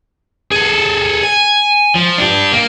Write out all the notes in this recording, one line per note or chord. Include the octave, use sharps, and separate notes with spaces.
G#4 A4
G#5
F3
D4 G4
A#3